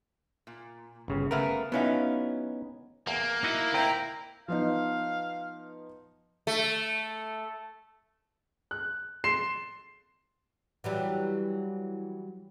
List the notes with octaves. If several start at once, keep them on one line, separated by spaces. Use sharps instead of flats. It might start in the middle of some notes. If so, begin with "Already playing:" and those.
A#2
G1 C#3
C#3 A3 B3 A#4 B4 F5
F#3 B3 C#4 D#4 E4 F5
E2 A#3
D#4 E4 F#4 D#5
D2 C4 E4 D#5 G5 A#5
F3 B3 D#4 F5
A3
F#6
C6 C7 E7
E3 F#3 G3